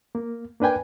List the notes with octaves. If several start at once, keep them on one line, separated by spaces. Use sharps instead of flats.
A#3
A#3 D4 B4 G5 G#5